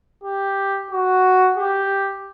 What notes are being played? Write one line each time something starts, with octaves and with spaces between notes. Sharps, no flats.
G4
F#4
G4